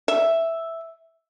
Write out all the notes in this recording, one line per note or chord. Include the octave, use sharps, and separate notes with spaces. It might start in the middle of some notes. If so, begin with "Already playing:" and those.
E5